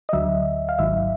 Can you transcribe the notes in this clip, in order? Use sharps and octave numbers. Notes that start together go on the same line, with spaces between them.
D#5
D2 D3 F#3 E5
F5
G#1 G#2 D#3 F#3 E5